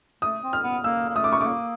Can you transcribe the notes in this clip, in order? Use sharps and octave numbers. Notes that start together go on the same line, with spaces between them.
A3 D#6
C4
F6
B3
A#3 E6
A#3
A3 D#6
D6
C#6
A3 D6
A#3